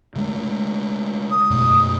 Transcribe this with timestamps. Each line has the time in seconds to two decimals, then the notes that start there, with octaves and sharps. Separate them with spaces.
0.16 C#3 G#3 A3
1.31 D#6
1.50 F#2 B2 A3